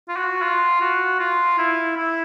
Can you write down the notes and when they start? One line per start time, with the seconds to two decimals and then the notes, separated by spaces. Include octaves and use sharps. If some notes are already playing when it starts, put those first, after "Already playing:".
0.09 F4
0.16 F#4
0.42 F4
0.81 F#4
1.20 F4
1.58 E4
1.97 E4